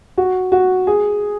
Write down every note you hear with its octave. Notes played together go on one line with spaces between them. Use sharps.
F#4
F#4
G#4